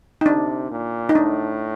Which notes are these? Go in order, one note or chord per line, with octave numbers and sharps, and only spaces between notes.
D#4
C3 D4
A#2
D#4
A2 D4